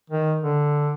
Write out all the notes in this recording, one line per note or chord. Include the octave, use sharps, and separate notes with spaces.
D#3
D3